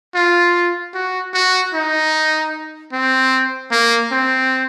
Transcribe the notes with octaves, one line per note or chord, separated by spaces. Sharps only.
F4
F#4
F#4
D#4
C4
A#3
C4